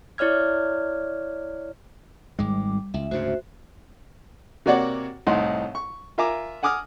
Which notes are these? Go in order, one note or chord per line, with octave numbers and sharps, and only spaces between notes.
E4 C#5 D5 F6 G#6
G#1 G#2 G3 G#3 D6
C#2 E5
D2 G#2 C#3 F#4 C5 E5
C3 A#3 F#4 C#5 D5 F#5
C2 A2 D#4 F#5 C6
C#6
F4 A#4 E5 G#5 A#5 D6
F#5 G#5 D6 D#6 F6